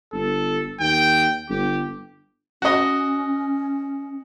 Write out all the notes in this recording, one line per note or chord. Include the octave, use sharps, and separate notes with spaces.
G1 A4
D#2 G5
G1 G4
C#4 F#4 D#5